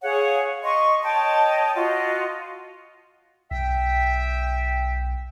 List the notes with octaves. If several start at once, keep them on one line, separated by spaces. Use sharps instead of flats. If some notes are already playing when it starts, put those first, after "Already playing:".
G#4 C#5 F5 F#5
D#5 C6 C#6
C#5 D#5 G5 A5
F4 F#4 D#5
B1 E5 G5